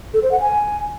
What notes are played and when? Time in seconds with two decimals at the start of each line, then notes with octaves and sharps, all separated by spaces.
0.14 A4
0.23 C5
0.32 F#5
0.40 G#5